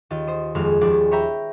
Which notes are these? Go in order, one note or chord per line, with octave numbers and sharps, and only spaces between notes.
D#2 F4 D#5
C5 D#6
D#1 F2 G#3 F6
D#1 D#2 F3 G#4 D5 A6
B4 C#5 E5 G5 A#5 B5